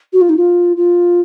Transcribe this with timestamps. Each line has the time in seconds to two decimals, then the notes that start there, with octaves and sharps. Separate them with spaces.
0.13 F#4
0.21 F4
0.29 D#4
0.37 F4
0.77 F4